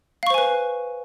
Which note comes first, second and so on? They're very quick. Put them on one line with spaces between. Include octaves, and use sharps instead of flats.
F5 C#6 C5 G#5 B4